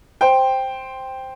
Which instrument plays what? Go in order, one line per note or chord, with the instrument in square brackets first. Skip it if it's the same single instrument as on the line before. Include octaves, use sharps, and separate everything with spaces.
[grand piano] C5 G5